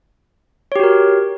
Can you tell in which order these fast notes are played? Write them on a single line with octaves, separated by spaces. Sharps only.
C#5 G4 F#4 A#4